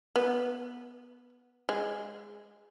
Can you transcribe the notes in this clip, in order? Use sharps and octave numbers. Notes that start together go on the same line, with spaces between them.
B3
G#3